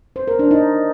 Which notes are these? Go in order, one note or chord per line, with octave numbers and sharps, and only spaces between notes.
C5
A#4
D4
D#4